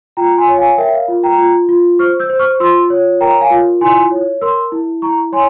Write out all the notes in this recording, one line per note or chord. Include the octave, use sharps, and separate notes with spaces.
F4 G5 A#5
G#5 C6
C#5
F5 G#5
A#4 E5 G5
F5
F4
G5 A#5
F4
F4
C5 C#6 F6
E6 G6
C5
C#6 F6
F4 C6 E6
C#5
A#4 G5 A#5
F5 G#5
F4
E4 G#5 C6
C#5
A#4 C6 E6
E4
E4 A#5 C#6
C#5 G#5 C6